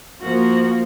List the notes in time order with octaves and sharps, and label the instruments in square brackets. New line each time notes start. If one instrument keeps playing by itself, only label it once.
[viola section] F3 A#3 [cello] F#4